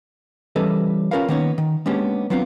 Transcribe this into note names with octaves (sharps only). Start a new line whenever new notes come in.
E3 G3 C#4 A4 B4 D#5
C#4 F4 A#4 B4 C#5 F5
D#3 A#3 B3 C#4 D#4 C#5
D#3
G#3 A#3 B3 C#4 D4 G4
F#3 B3 C4 D4 F4